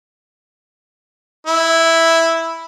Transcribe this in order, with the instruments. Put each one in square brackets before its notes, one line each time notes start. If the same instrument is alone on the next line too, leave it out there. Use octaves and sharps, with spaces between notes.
[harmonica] E4